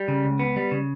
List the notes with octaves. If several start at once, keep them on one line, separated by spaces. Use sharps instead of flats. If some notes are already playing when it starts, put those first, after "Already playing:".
Already playing: G3
C#3
C#2
B3
G3
C#3